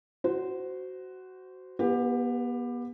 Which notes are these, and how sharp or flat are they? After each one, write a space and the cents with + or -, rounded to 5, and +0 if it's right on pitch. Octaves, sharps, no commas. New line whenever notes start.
F#4 +10 C5 -15
B3 -35 G4 +20 B4 +15